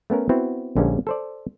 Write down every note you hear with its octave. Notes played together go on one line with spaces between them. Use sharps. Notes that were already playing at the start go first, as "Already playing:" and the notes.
A3 B3 C#4 A#4
B3 C4 E4 F#4
A#1 D3 G3 G#3 A#3 C#4
A4 C5 D5